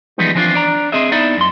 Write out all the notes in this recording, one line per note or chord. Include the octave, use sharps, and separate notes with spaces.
E3 F3 G3 G#3 B3 D#4
E3 F3 C4 D4 D#4 F4
D4 D5 A#5
C4 G#4 D#5 E5
B3 D#4 E4 D5 E5
F#2 C6